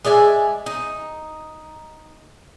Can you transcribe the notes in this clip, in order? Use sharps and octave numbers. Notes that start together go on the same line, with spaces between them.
G#3 D5 E5 G#5
D#4